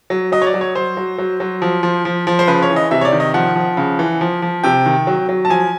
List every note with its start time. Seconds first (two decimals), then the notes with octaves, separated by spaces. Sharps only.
0.10 F#3
0.32 F#3 D#5
0.42 C#5
0.47 D5
0.54 F#3
0.61 C#5
0.75 F#3 C5
0.97 F#3
1.18 F#3
1.40 F#3
1.62 F3
1.83 F3
2.05 F3
2.27 F3
2.39 C5
2.48 C#3 B4
2.62 C#5
2.70 E3
2.76 D#5
2.91 C3 E5
3.01 C#5
3.05 D5
3.12 D#3
3.20 D#5
3.34 F3 F#5
3.55 F3
3.77 C#3
3.99 E3
4.21 F3
4.42 F3
4.64 C3 G5
4.86 D#3
5.07 F#3
5.29 F#3
5.45 A5
5.50 F3 G#5